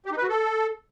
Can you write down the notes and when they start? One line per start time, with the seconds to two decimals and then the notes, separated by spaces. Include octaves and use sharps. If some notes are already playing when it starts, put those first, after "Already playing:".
0.06 G4
0.11 D#4
0.17 B4
0.23 F#4
0.29 A4